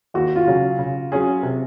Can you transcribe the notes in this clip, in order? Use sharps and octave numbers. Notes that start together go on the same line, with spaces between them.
D#2 F#4
F4
C#3 F#3 C#4
C#3
F#3 C#4 G#4
C3